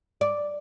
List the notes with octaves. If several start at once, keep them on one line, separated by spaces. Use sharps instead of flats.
D5